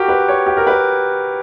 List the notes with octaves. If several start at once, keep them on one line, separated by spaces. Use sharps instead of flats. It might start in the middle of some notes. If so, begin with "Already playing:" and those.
Already playing: F#4 G4 A#4
B4
C#5
G4
A#4
B4